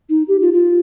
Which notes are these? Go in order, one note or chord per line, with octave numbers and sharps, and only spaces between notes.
D#4
G4
F4
F4